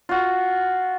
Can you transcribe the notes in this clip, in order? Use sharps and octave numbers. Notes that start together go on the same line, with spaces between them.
F4 F#4